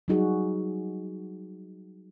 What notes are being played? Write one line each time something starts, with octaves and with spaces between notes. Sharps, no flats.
F#3 G3 D#4 F#4 G#4